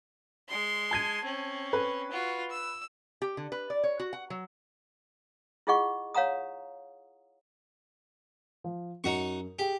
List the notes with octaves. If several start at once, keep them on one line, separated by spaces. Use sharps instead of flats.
G#3 C6
A5 G#6 D#7
C4 C#4
B4
F4 F#4
E6
G4
D3
B4
D5
C#5
F#4
F#5
F#3
E4 F4 G#4 D#5 F#5 C#6
C#5 F5 F#5 A#5 D#6
F3
F#2 D#4 F#4 C#6
G4 G#4 G5